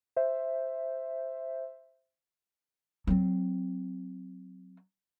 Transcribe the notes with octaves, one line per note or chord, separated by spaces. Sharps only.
C5 E5
F#3 C4